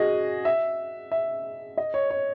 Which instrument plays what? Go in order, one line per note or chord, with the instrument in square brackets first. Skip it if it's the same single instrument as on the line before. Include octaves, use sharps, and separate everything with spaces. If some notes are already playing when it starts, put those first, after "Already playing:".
Already playing: [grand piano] F#4 G#4 D#5
E5
E5
D#5
C#5
C#5